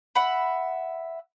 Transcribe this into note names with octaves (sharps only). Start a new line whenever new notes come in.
E5 F#5 B5